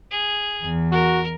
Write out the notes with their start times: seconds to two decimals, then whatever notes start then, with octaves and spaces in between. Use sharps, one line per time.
0.11 G#4
0.62 E2
0.92 F#4 A#4